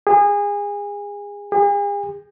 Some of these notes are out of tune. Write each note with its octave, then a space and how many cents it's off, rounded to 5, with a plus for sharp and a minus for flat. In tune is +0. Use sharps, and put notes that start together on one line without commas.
G#4 -25
G#4 -40